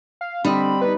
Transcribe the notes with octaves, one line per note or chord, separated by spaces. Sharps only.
F5
D3 G3 C4 D#5 B5
B3 D#4 B4